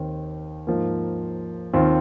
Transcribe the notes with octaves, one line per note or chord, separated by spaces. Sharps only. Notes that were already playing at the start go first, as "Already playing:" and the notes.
Already playing: D#2 D#3 C4
G#2 F3 A#3
D#2 D#3 C4 F4